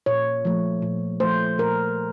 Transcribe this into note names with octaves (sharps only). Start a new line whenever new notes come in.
A#2 C#5
F3 A3
A#2
F3 A3 C5
A#2 A#4